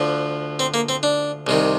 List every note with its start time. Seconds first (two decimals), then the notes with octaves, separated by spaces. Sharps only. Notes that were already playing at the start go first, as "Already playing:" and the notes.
Already playing: D2 D3 F3
0.59 C4
0.74 A#3
0.89 C4
1.03 D4
1.47 C2 C3 D#3